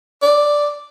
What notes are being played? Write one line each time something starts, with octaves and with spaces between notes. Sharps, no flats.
D5